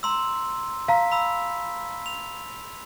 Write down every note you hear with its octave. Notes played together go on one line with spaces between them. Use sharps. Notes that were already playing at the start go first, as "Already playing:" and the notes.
A#5 C6 E6
F5 A5 A#5 B6
B5 E6
F7